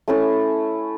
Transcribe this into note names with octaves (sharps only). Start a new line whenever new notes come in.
A3 C#4 E4 A4